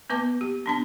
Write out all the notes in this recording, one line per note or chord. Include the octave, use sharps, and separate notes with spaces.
A#3 B3 B4 D6
G4
B3 D4 A5